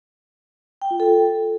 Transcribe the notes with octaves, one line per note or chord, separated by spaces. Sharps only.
G5
F4
A4